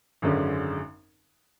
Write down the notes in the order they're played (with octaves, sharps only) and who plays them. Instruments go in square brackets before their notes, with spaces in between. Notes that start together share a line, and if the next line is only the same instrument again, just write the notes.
[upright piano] G#1 F#2 D3 G#3 C#4